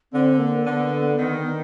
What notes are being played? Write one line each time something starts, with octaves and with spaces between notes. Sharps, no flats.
D3 C4
A#3
D3 B3
D#3